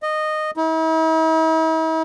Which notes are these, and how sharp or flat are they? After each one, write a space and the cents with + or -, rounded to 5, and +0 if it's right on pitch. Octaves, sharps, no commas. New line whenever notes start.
D#5 -15
E4 -45